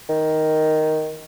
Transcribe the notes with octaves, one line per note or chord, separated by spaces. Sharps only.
D#3